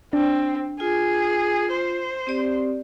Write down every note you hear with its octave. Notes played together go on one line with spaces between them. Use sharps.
C4 D4
F4 G#4
C5
C4 G4 D5